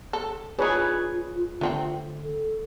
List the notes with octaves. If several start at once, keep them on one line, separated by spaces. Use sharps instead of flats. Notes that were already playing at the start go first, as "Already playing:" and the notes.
A4
D4 D#4 F4 G#4 B4 C#5
D3 A3 C4 G5
A4